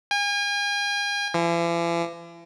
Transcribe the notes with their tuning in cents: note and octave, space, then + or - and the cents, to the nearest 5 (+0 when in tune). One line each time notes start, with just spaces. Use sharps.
G#5 -40
E3 +45